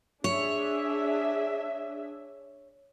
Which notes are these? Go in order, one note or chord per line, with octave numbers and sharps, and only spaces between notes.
D4 G#4 C#5 E5